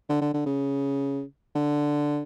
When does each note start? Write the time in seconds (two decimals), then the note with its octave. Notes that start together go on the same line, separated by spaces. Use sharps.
0.09 D3
0.21 D3
0.34 D3
0.46 C#3
1.55 D3